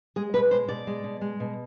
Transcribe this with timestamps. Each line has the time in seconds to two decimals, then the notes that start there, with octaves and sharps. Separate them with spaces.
0.16 G#3 G#4
0.33 B2 B4
0.51 G#3 C5
0.68 B2 D5
0.87 G#3
1.04 B2
1.21 G#3
1.40 B2